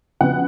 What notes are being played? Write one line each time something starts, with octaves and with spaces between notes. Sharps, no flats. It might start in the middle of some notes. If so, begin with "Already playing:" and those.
C#3 F3 B3 F#5